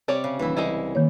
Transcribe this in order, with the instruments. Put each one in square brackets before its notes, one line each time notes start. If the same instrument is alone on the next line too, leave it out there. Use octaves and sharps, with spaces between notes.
[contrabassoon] C3 [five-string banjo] G3 C#5 D5
[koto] C#3
[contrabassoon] D#1 [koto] E3 E4
[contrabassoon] C2 [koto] E3 [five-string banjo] G#3 D#4 E4
[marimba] D#3 A#3 C#5